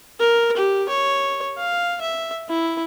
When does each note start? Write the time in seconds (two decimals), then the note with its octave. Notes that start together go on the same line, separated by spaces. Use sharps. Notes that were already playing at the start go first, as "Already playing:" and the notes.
0.20 A#4
0.57 G4
0.89 C#5
1.58 F5
2.01 E5
2.49 E4